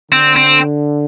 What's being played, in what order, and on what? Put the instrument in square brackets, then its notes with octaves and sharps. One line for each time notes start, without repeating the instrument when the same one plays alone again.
[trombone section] D3 [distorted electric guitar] C4
[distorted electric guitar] C4